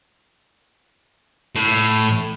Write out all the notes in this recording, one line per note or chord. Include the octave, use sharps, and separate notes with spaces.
A2